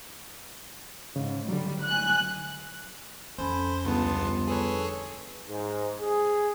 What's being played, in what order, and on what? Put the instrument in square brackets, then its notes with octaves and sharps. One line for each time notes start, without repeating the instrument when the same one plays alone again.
[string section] G#2 [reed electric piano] C#3
[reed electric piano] D3 F#3 [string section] G3
[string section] G#5 F#6
[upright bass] F2 C#4 [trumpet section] A4 G#5 B5 [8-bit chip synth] C5
[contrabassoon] G1 [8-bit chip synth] C#2 B3 [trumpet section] G#4 A5 C6
[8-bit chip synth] G#4 A4 C#5 [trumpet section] B4
[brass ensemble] G#2
G#4